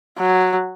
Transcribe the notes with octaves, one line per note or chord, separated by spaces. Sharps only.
F#3